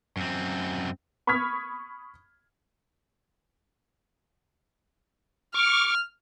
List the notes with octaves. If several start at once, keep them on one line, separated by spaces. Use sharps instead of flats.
F#2 C4
B5 C#6 D#6 F6 G#6 B6
C#6 D6 F6